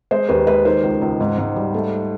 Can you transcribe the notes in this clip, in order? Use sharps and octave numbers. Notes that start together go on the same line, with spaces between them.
G#3 C5
D#2 B4
G#3 B4
D#3 C5
C#2
C#2
G#2
G#2
G3
A3